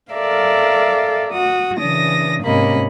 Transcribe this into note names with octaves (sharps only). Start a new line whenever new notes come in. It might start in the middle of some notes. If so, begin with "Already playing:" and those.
A4 A#4 D5 E5 F5
F#4 D#6
C#3 E3 D4 D#6 A#6
G#2 C3 A#3 C#4 D#5 B5